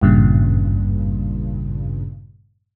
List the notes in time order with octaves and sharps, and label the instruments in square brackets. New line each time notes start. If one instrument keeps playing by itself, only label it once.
[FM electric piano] G#1 E2 G2 A#2 C#3